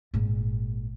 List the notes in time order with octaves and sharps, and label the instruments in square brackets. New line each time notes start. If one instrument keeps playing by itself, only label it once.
[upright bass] G#1 A#2